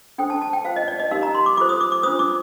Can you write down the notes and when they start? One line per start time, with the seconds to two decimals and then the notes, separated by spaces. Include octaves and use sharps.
0.18 D4 A4 C5 G5
0.30 A5
0.42 A5
0.53 G5
0.65 F4 C5 F5
0.76 D#5
0.88 D5
0.99 D#5
1.11 D#4 G4 A#4 F5
1.23 A#5
1.34 C6
1.46 D6
1.57 F4 A4 C5 D6
1.69 D#6
1.81 D6
1.92 D6
2.03 D4 F4 C5 D#6
2.19 D6